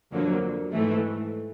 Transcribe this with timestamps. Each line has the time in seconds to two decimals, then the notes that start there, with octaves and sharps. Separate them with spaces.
0.12 F2 D3 F#3 A#3
0.71 G#2 E3 A3